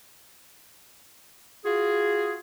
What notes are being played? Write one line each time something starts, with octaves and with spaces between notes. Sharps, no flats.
F4 F#4 G#4